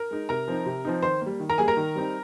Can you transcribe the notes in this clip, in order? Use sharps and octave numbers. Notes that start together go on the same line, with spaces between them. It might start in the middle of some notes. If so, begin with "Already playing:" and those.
Already playing: A#4
G#3 D#4
C3 A#4 A#5
F3 C4 D#4
C3
F3 C4 D#4
D#3 C5 C6
G3 A#3
D#3
A#4 A#5
G3 A#3 G#4 G#5
A#4 A#5
D#3
G3 C4 D#4